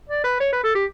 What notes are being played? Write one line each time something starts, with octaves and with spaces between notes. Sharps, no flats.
D5
B4
C#5
B4
A4
G4